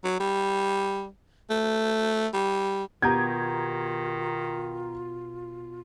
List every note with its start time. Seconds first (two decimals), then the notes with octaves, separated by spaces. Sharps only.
0.04 F#3
0.20 G3
1.50 A3
2.34 G3
3.02 B2 D#3 F4 G4 A#5 D#6 G6 G#6